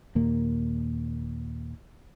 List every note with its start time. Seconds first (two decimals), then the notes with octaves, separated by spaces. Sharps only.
0.15 D#2 A#2 A#3